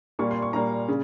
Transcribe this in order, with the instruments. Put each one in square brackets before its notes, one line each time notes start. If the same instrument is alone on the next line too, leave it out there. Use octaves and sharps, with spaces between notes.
[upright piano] A#2 G3 A#3 C#6
C6
C#6
A#2 G3 A#3 A#5
C#3